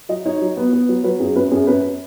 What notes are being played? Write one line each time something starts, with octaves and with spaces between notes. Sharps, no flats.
F#3 D#5
D#4 C#5
F#3
B3
B3
F#3
F#3 B4
F#2 G#4
F#2 B4
F#2 G#4
F#2 B4